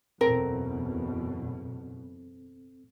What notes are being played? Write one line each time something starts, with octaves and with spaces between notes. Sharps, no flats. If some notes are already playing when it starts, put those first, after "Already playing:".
F#1 E2 B2 C4 A4 A#4